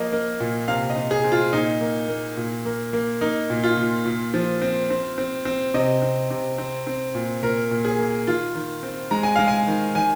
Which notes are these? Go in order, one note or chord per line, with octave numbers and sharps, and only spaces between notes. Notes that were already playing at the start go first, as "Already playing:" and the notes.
Already playing: F3 A#3 D#5
A#3
A#2
C3 F5
D#5
C3
G#4
C4
F4
A#2 D#4
A#3
A#3
A#2
A#3
A#3
A#3 D#4
A#2
F4
A#2
A#2
F3
C4
C4
C4
C4
C3 D#5
C4
C3
C4
C4
A#2
A#2 A#4
A#2
G#4
A#3
D#3 F4
D#3
C4
G#3 A#5
G#5
G#3 F5
G#5
D#3
D#3 G#5